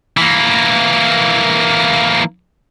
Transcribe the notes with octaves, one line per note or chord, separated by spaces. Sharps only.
E3 A#3